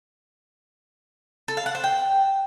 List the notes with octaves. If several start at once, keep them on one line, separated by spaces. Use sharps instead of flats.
A4
F5
F#5
C5
G5